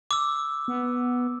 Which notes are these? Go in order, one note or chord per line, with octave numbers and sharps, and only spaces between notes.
D6 E6
B3